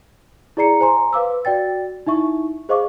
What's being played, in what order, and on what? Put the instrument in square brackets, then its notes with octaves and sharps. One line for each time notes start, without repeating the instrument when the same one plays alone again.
[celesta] E4 G#4 D5 A#5 C7 C#7
C5 G#5 A#5 C6
B4 F5 D6 E6
F#4 D5 G5 A6
D#4 E4 E5 C#6
G#4 C5 D#5 F5 C#6 D6